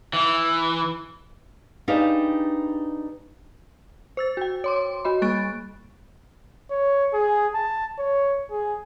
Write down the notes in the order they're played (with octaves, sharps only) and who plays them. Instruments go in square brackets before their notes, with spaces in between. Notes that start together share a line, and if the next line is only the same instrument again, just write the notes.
[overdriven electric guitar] E3
[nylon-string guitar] D4 D#4 G4 G#4 B4 F5
[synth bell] C5 E6 A6
F#4 G5
C#5 C6 D6
C6
F#4 D#5 B5
G3 A#3 C#6 F#6 A6 D7
[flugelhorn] C#5
G#4
A5
C#5
G#4